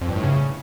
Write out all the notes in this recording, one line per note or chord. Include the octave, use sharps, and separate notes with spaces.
F2
G2
A2
C#3